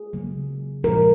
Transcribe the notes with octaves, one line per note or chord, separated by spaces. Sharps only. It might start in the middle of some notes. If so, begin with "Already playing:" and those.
Already playing: G#4
C#3 F#3 A#3
A#2 F3 G#3 A#4